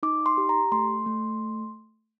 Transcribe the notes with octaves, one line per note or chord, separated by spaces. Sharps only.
D#4 D6
C6
G4
A#5
A3 C6
A3